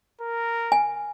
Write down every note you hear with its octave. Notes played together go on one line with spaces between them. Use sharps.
A#4
G#5